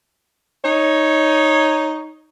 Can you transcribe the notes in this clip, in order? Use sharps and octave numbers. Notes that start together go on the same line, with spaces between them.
D#4 C#5